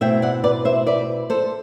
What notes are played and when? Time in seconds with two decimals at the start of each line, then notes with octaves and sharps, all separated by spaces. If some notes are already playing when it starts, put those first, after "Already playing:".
0.01 B2 A3 C4 E4 E5 G5
0.22 D5 F#5
0.44 B4 D5
0.65 C5 E5
0.87 B4 D5
1.30 A4 C5